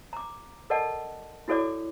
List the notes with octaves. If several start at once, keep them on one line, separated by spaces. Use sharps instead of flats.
A#5 D6
A4 A#4 D5 D#5 F#5 A5
E4 F#4 A4 C#5 D5 D6